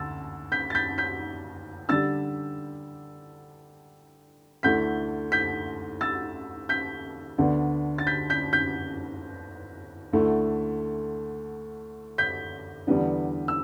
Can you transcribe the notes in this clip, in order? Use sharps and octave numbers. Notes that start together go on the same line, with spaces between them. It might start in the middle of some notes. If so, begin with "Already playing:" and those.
Already playing: D2 E6 A6
G6 B6
A6
G6 B6
G6 B6
D3 G3 D4 E6 A6
D2 D3 A3 E4 G6 B6
G6 B6
E6 A6
G6 B6
D2 D3 B3 D4
A6
G6 B6
G6 B6
G6 B6
D2 D3 A3 E4
G6 B6
E2 D3 G3 B3 D4
E6